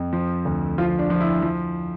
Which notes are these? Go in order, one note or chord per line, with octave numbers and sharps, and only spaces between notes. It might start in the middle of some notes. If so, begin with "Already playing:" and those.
Already playing: F2
F3
D2
F3 F4
D4
F3
E4
F3